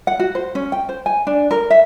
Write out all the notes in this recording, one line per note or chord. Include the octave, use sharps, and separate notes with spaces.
F#5
F#4
C5
C#4
G5
C5
G#5
D4
A#4
E5